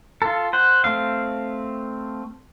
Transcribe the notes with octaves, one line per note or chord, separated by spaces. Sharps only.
F4 A4
C5 F#5
A3 C4 F5